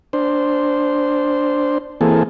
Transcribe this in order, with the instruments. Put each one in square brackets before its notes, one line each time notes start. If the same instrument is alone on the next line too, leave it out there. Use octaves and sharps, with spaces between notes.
[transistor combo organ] D4 C5
E3 A#3 C4 G#4 A4